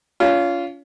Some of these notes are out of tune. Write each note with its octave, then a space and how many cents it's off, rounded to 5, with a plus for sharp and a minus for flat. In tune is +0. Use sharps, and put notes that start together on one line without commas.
C#4 +35 F4 -10